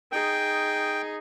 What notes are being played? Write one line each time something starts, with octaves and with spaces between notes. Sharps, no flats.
D#4 G#4 G5